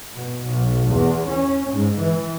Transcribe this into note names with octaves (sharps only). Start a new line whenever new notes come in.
B2
B1
E2
C#4
G#2
E3